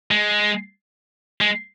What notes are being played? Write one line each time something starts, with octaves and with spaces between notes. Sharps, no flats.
G#3
G#3